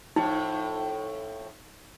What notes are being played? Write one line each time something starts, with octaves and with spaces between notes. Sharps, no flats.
F2 A2 D#4